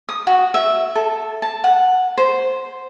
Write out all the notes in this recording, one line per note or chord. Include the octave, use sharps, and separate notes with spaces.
D#6
F#4
E5
A4
A5
F#5
C5